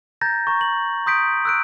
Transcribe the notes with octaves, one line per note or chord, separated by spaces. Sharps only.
A#5 G6 A6 A#6
A#5 C#6
F#7
C6 D#6 G6 B6 D7
E6 F#6 D7